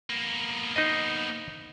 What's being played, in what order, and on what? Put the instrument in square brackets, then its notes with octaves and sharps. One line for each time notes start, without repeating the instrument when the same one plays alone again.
[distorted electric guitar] A#3 B3
[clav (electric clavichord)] D#4 C5 D#5